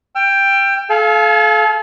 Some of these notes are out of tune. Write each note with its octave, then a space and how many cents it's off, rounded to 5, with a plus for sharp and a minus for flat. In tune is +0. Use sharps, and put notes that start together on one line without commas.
G5 +10 E6 +40
A4 -35 F5 -10 G#5 +35